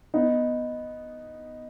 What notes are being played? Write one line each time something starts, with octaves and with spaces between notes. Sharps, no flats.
B3 D#4